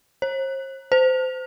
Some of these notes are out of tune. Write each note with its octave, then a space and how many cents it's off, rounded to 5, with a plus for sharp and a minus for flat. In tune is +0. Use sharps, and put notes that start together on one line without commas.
C5 +45
C5 -25